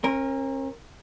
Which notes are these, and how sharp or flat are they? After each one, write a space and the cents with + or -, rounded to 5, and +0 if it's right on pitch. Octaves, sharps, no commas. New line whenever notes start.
C#4 -45 A#4 +0